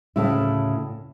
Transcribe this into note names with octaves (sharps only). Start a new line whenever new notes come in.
D2 A2 C#3 A3 E4